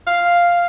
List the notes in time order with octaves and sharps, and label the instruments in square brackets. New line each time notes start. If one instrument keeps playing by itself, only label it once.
[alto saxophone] F5